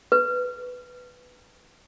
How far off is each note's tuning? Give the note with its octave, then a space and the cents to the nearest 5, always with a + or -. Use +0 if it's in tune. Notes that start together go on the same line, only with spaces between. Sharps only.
B4 +5